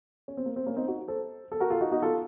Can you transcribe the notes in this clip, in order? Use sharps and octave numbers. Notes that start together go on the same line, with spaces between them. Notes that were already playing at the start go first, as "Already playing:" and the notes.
C#4
C4
A#3
C4
A#3 C#4
C4 D#4
D#4 F#4
A4 C5
A4
F#4 A#4
F4 A4
D#4 F#4
D#4 F#4
F4 A4